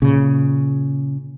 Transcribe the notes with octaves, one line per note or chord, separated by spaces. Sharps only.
A#2 C#3